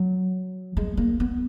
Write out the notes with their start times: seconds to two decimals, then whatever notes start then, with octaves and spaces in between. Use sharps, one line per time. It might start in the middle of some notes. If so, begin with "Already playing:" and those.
Already playing: F#3
0.77 G#3
0.97 A#3
1.20 B3